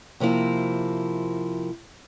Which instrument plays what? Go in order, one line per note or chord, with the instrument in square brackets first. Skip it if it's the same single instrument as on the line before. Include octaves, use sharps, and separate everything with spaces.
[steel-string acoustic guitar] C3 F3 A#3 E4